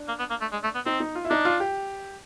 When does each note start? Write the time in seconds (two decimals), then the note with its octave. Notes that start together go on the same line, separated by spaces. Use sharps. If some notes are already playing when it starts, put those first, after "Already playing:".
Already playing: D4
0.08 A#3
0.19 B3
0.30 A#3
0.41 A3
0.53 G#3
0.64 A3
0.75 B3
0.86 C4 D#4
1.00 D#4
1.15 F4
1.25 E4
1.30 D4 D#4
1.45 F4
1.60 G4